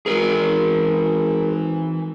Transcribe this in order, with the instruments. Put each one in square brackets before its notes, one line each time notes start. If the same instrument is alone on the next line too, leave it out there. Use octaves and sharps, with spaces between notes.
[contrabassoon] G#1 [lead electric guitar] E3 A#5 [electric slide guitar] G#4 A#4